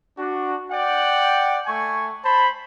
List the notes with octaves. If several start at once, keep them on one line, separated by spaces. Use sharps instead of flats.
D4 F#4
D5 F#5 G5
A3 G#5 C#6
C5 A5 B5